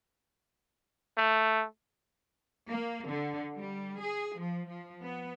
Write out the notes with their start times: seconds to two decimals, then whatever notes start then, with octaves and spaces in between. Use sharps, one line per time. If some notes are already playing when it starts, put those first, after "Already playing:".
1.17 A3
2.69 A#3
3.07 D3
3.56 G3
3.98 G#4
4.36 F3
4.66 F3
5.02 B3